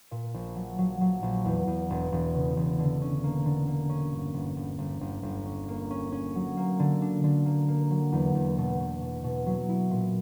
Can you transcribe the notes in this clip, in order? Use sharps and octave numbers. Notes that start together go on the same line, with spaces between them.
A#2
A#1
F#3
F#3
F#3
A#1
E2
E2
E1
E1
C#3
E1
D3
C#4
A#3
D3
A#3
C#4
G1
G1
G1
G1
G1
G1
C#4
A#3
C#4
C#4
F#3
A#3
D3
D4
D3
A#3
A#3
F#3
E2
E2
B2
B2
B2
B2
F#3
E4
A#2